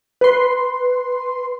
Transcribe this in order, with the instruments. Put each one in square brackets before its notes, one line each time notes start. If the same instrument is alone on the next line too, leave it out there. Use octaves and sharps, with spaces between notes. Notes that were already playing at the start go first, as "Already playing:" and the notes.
[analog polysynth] B4 C6